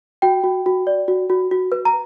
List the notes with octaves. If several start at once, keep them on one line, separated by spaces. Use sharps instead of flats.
F#4 G5
F#4
F#4
D5
F#4
F#4
F#4
B4
A#5